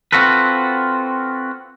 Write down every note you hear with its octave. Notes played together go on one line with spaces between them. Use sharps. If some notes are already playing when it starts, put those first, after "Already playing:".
C4 F4 F#4 A4 B4